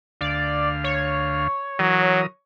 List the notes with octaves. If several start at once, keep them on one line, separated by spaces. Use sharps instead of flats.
D2 D5 F5
C#5
E3 F#3 A#4 D#6